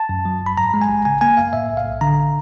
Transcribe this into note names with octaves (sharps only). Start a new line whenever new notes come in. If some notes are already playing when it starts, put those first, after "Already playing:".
Already playing: A5
F#2
F#3
G1 B5
G#2 A#5
G#3
G#5
A1
C#3 G#5
A#3 G#5
F#2 F5
A2 E5
B1
F5
B1
D3 A#5